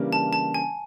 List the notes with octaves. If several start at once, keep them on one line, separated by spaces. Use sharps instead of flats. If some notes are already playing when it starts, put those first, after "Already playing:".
Already playing: C#3 E3 G3 A#3 D4
A5
A5
G#5